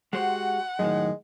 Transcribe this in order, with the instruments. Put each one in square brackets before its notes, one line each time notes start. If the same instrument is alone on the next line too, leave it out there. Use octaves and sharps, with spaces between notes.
[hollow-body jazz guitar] G#3 G4 C5 [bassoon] F#4 [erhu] F#5
[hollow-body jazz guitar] F#2 A2 D#3 [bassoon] G#3